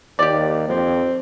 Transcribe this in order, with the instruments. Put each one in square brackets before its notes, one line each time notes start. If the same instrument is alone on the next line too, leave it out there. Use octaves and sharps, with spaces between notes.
[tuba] D#2 [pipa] G4 D5
[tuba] F2 [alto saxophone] C4